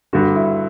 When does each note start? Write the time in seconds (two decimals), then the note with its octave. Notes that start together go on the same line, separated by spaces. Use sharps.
0.13 G2 D3 F#4
0.35 E4